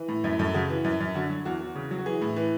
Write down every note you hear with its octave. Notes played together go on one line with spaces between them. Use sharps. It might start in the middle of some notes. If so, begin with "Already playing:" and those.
Already playing: E3
A2
F#2 E4
F#2 A4
C#3 F#4
E3
F#2
F#2
D3 F#4
F#3
E2 F#4
E2
C#3
F#3
F#4
E3 G#4
A2
E3